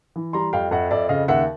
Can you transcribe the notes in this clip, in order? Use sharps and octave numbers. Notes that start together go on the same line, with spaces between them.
E3
G3 A#5 C6
F2 F5 G5
F2 E5 F#5
F2 D5 E5
C#3 D#5 F5
D#2 E5 F#5